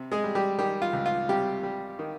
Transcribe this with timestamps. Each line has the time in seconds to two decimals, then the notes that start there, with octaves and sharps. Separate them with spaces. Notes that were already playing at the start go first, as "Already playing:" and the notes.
Already playing: C3
0.12 G#3 G#4
0.24 G3
0.35 G3 G4
0.59 D#3 G3 G4
0.82 F4
0.93 C#2
1.06 F4
1.29 C3 G3 G4
1.63 G3
1.99 D#3